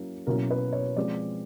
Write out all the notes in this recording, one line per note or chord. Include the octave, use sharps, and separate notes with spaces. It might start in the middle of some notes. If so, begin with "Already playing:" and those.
Already playing: F#3 A#3 C#4 E4
B2 F#3 A#3 C#4 E4 A#4
B4
C#5
F3 G#3 C4 D5